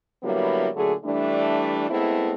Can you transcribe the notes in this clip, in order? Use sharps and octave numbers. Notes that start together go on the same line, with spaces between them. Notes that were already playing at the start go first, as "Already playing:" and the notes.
D3 F#3 G3 A#3 B3 E4
A#2 D3 F#3 A3 G#4
E3 G3 A3 D4
G#3 A3 B3 C4 E4